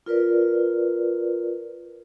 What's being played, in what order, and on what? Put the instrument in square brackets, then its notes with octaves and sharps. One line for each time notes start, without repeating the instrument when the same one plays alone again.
[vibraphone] F4 A#4 B4 D5